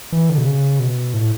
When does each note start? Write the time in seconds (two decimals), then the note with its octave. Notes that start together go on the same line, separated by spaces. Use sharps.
0.12 E3
0.29 D3
0.38 B2
0.46 C#3
0.79 B2
1.14 A2